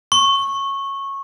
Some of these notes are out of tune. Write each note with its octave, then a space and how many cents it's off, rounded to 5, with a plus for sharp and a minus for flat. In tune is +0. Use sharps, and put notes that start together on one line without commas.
C#6 -15